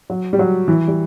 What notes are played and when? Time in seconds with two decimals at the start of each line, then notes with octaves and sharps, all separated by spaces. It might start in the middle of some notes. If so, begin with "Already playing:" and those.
0.10 F#3
0.33 G3
0.39 F#3
0.68 E3
0.88 G3